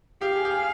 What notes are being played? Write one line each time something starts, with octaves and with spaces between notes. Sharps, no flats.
G4 F5
G#4
G4
G#4